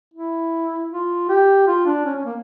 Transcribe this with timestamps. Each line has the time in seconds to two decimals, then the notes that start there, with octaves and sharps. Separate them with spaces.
0.14 E4
0.91 F4
1.29 G4
1.67 F4
1.86 D4
2.06 C#4
2.16 C#4
2.26 A#3